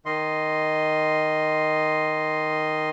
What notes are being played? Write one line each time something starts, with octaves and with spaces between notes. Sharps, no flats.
D#3 D#5 C6